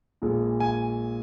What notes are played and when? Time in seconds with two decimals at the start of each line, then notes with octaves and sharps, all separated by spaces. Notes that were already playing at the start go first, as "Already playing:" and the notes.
0.22 A#1 A#2 G#3
0.60 G#5